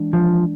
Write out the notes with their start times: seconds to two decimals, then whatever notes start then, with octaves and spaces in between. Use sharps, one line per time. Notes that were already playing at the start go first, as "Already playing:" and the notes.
Already playing: E3 G#3 D4
0.13 F3